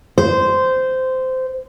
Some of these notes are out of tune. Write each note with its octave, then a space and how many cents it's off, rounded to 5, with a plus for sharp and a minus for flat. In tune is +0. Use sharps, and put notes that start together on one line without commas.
C5 -15